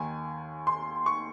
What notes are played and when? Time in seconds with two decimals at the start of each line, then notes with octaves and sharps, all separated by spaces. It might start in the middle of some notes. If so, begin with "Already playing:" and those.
Already playing: D#2 D#3 G#5
0.67 C6
1.06 C#6